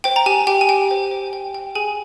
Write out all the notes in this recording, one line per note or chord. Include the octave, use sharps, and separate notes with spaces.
C5 G5
A#5
G4 G#5
G4 G5
G#5
G4 G5
C5
C5
G5
G5
G#4 G#5